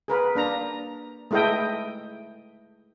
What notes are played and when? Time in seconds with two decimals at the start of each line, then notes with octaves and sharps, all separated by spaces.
0.08 G#4 A#4 B4
0.35 A#3 D4 A#5
1.31 G#3 A3 E4 A4 D#5 G5